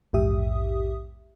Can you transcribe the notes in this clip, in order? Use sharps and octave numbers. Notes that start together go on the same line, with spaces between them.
A#1 E2 G#2 G4 E5 D#6